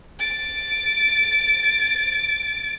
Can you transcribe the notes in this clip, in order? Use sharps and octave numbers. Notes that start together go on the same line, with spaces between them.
A6 D7